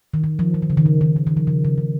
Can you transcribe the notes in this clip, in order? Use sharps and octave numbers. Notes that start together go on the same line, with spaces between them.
D#3
D#3
F3
F3
D#3
C#3
D#3
C#3
D#3
D#3
D#3
F3
C#3
C#3
C#3